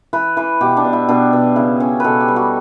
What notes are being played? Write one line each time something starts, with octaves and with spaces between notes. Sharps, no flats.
E3 B4
E3 B4
B2 G4
D4
B2
E4
B2 D4
B2
C#3 E4
C#4 C#5
B2 A4 B4
G4
G3
F#4